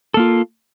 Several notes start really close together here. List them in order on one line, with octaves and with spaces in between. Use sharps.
A4 A#3 F4